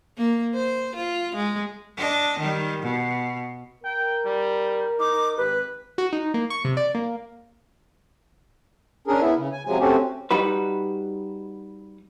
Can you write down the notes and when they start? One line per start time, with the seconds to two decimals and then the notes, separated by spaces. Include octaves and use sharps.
0.18 A#3
0.55 C5
0.96 F4
1.36 G#3
1.97 D4 D#5
2.39 D#3 G3
2.82 B2
3.84 A#4 G5
4.25 G3
4.99 D#4 D6
5.37 G#1 G4 B4
5.98 F#4
6.13 D#4
6.34 A#3
6.50 C#6
6.65 C3
6.77 D5
6.95 A#3
9.07 C#4 D4 G#4 A#4
9.21 B3 E4 E5
9.37 C#3
9.52 G#5
9.65 C3 F3 F#3 G#3 G#5
9.80 A3 C4 C#4 F#4 G4
10.31 G3 D#4 F#4 B4